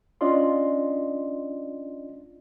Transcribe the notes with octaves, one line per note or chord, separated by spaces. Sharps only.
C#4 D4 F4 D5 D#5 C6